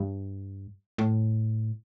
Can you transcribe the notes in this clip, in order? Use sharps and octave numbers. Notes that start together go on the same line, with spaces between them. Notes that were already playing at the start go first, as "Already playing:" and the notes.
Already playing: G2
A2